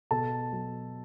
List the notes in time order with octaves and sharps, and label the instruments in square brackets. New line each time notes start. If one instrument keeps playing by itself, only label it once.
[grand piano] B2 A4 A5
F#3